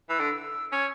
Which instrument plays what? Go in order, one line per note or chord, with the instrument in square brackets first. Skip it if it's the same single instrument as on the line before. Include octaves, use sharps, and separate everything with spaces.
[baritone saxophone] E3 [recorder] E6
[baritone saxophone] D3
[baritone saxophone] C#4 [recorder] G#6